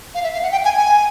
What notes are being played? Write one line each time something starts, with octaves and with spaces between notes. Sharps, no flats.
F5
E5
F5
F#5
G5
G#5
G#5